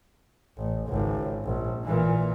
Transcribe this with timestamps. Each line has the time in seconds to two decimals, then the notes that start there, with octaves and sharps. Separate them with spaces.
0.57 A1
0.87 G#1 C#2
1.44 A#1
1.84 A#2 E3